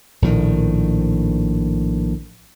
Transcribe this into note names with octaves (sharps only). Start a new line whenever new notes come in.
A#1 A2 D#3